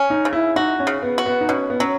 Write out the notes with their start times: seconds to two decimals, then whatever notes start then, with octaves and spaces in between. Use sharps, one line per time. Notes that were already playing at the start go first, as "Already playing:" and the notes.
Already playing: C#4
0.10 D#4
0.25 C#3
0.33 E4
0.56 D#4 F#4
0.79 C#4
0.87 C#3
1.02 B3
1.18 F#4
1.26 B3
1.41 D#4
1.49 B2 C#4
1.70 B3
1.80 F#3 C#4